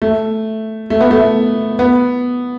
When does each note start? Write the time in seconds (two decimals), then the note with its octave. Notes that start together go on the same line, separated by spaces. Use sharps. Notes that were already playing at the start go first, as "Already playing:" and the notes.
0.02 A3
0.90 A3
1.01 B3
1.11 A3
1.79 B3